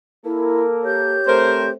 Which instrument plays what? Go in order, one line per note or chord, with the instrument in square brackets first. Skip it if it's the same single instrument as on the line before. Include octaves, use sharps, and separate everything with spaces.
[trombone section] A#3 A4 A#4 [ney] E4
[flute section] G4 G6 [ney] C#5
[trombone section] A3 C4 [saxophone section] A#4 C5